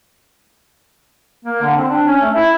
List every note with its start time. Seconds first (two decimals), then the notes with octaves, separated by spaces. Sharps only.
1.45 A#3
1.62 D3
1.77 C4
1.90 D4
2.07 C#4
2.21 A3
2.35 E4